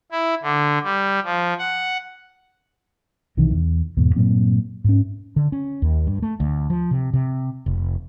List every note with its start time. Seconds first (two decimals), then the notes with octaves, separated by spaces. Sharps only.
0.12 E4
0.43 D3
0.84 G3
1.24 F3
1.59 F#5
3.37 B1 C3 D#3 E3
3.52 E2
3.97 E2 G#2 B2
4.16 G2 A#2 F#3 C4
4.84 G#2 C#4
5.36 D3
5.52 C#4
5.82 D#2
6.07 G2
6.22 A3
6.40 D2
6.70 F3
6.91 C3
7.13 C3
7.66 F1